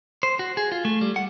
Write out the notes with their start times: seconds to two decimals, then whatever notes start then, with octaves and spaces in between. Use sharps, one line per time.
0.23 C5
0.39 F#4
0.57 G#4
0.72 F4
0.85 A3
1.01 G3
1.16 F#5